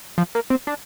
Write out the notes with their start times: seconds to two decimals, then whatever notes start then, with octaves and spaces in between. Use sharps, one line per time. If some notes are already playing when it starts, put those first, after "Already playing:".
0.18 F3
0.35 A#3
0.50 C4
0.67 D4